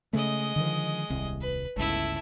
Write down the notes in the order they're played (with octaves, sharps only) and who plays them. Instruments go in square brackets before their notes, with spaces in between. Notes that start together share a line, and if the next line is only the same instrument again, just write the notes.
[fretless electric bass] C#3 A3 [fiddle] G#3 D#5
[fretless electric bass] D3 D#3 F3
D#1 C2
[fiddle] B4
[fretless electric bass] G1 C#2 [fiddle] A3 E4